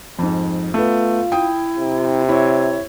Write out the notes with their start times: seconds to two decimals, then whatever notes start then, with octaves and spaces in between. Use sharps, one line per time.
0.19 F2 G#2
0.74 A3 B3 F4
1.32 E4 G5 D#6
1.77 C3
2.29 E4 C#5